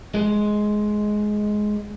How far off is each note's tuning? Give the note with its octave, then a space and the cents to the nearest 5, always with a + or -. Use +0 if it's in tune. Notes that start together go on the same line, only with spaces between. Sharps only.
G#3 +10